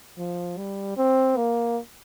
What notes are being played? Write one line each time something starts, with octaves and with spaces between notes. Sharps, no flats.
F3
G3
C4
A#3